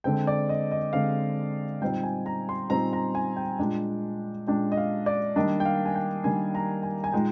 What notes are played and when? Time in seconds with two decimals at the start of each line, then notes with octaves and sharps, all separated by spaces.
0.04 D3 G#3 C4 G5
0.27 D5
0.49 D#5
0.71 D#5
0.93 D3 G#3 C4 F5
1.81 A#2 G3 C4 D#4 G5
2.03 G#5
2.26 A#5
2.49 C6
2.70 A#2 G3 C4 D#4 A#5
2.93 A#5
3.15 G#5
3.37 G5
3.59 A#2 G#3 D4
4.47 A#2 G#3 D4 G5
4.72 D#5
4.77 F5
5.06 D5
5.36 D#3 G3 A#3 D4 D#5
5.60 G5
5.65 F5
5.85 G#5
5.95 G5
6.24 D#3 G3 A#3 D4 G#5
6.55 A#5
6.83 G#5
7.04 G#5
7.12 A#2 G#3 D#4 G5